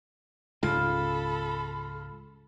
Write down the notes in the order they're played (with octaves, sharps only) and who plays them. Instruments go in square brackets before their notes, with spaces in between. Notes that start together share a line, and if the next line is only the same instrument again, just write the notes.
[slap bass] C#2 G#2 C#3 [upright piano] F4 [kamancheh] A4 B5